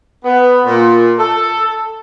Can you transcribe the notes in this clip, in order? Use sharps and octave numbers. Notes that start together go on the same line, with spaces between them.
B3
A#2
A4